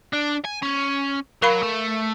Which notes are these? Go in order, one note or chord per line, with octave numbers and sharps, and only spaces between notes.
D4
G#5
C#4
F#3 A#4 F5 B5
A3